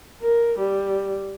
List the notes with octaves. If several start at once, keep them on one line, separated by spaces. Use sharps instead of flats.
A#4
G3